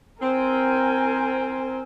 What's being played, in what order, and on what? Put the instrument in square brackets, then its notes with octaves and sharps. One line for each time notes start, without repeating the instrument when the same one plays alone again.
[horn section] C4 [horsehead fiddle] A#4 G#5